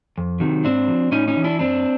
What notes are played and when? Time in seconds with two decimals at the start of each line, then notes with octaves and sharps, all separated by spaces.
0.18 F2
0.40 C3 D#3 F#3
0.65 G#2 C4 D4
0.88 F3
1.12 A2 C#4 D#4
1.28 C#4 D#4
1.37 E3
1.44 D4 E4
1.59 F#2 C4 D4